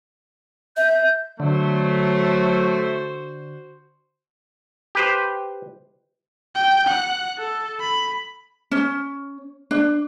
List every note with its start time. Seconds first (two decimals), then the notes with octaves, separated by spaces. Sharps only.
0.77 E5 G6
1.40 D3 F#3 A3 F#4 C5
4.95 G4 B4 C5
6.55 G5
6.87 F#5
7.38 A4
7.80 B5
8.71 C#4
9.71 D4